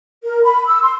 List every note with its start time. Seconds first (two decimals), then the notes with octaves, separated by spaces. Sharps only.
0.24 A#4
0.43 B5
0.67 E6
0.82 C6